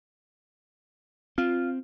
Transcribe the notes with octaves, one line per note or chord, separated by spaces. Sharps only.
C4 F4